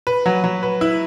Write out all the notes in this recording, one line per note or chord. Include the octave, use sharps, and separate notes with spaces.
B4
F#3
F#3
B4
E4